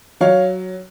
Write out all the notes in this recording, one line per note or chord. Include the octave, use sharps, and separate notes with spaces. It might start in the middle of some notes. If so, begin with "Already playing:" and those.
F#3 C#5 F5